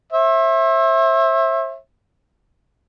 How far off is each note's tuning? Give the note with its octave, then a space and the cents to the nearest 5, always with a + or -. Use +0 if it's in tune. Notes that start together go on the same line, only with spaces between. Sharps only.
C5 +45 E5 +0